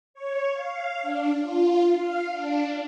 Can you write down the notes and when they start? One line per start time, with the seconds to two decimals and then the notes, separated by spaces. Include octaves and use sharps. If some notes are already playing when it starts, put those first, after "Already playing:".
0.14 C#5
0.53 F5
1.02 D4
1.41 F4
1.96 F5
2.32 D4